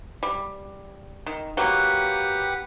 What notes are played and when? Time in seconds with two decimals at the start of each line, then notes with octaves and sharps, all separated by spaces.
0.23 G3
1.26 D#3
1.57 F#3 A#3 G4 B4 F#5